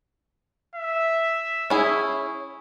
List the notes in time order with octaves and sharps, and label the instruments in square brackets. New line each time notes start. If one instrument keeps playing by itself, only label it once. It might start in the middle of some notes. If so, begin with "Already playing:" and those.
[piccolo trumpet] E5
[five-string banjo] C#4 E4 G#4